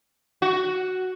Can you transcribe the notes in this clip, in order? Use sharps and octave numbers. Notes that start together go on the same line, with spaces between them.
F#4